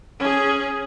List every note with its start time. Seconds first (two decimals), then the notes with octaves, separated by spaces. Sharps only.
0.19 C#4 G#4